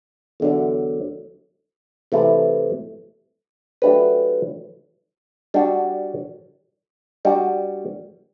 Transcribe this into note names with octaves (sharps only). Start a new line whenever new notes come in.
E2 D3 F#3
C3 E3 A3 E4
F#3 A3 D4 G4 B4
G3 D4 F#4
G3 D4 F#4